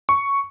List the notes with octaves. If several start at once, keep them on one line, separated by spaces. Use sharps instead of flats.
C#6